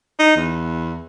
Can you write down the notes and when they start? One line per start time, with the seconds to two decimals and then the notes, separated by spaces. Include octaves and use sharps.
0.19 D#4
0.36 E2